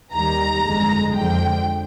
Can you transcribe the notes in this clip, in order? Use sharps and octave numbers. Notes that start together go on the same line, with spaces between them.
D#2 D#3 G3 A#5
G1 F2 D3 G#3
F2 D3 F3 G#3 G5